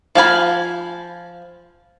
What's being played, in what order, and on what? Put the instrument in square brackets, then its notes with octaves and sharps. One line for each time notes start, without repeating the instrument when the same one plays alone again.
[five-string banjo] F3 F5 G#5 B5